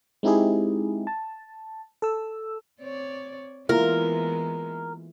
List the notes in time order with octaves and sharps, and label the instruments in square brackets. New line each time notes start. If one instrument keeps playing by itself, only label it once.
[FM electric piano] G#3 C4 D#4 E4 G4 G#4
A5
A4 E6
[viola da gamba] C4 C#5 D5
[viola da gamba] E3 G#3 B3 [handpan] A#3 E4 F4 [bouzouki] A#4